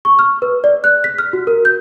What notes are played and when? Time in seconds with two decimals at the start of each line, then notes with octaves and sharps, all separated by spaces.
0.05 C#6
0.19 F6
0.42 B4
0.64 D5
0.84 F#6
1.04 B6
1.18 F6
1.33 F#4
1.47 A#4
1.65 G6